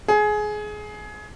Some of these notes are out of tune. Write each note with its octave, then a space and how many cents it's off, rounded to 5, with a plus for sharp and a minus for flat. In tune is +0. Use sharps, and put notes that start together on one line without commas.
G#4 +20